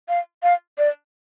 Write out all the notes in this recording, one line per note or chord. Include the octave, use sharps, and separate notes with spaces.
F5
F5
D5